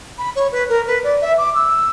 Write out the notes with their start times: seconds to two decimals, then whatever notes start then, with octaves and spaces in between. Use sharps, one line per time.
0.18 B5
0.36 C#5
0.52 B4
0.69 A#4
0.87 B4
1.04 D5
1.21 E5
1.38 D6
1.55 E6